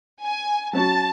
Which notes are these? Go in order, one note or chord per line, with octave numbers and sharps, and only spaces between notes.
G#5
F#3 C#4 F#4 A5